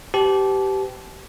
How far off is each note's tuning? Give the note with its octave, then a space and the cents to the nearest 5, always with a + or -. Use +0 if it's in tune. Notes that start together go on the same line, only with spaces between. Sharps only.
G4 -15 B4 +45 A5 -30